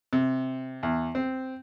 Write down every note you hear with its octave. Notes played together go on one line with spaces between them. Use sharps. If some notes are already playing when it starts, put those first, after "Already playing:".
C3
E2
C4